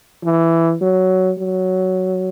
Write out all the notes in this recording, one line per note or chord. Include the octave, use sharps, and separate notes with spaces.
E3
F#3
F#3